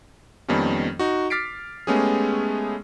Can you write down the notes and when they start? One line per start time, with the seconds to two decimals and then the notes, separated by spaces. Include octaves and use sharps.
0.48 F2 D#3 G3 A#3 B3 C#4
0.99 D#4 F#4
1.30 D6 F6 A6 B6 C7 D7
1.87 G#3 A3 B3 C#4 G4 G#4